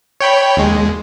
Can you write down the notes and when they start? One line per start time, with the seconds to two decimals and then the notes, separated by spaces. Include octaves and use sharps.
0.21 C#5 G5 B5
0.57 D#2 G#3